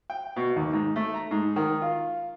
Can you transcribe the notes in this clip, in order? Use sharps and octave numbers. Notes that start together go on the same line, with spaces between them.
G5
B2
D#2
G#2
A3
A#5
G#2
D#3
F4